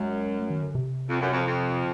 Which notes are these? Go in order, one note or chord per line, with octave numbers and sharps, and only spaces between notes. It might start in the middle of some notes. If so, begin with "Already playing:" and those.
Already playing: F#2 G#3
A3
D#3
D3
C3
F2
F#2
F2
F2